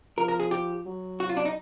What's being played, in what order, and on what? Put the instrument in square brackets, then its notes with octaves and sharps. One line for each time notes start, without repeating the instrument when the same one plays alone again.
[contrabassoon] F3 [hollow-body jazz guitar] A#4
[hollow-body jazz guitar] A#4
G#4
G4
[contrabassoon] F#3
[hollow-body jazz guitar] F#4
F4
D4
D#4